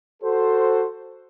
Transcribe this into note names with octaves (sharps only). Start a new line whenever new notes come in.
F#4 A4 C5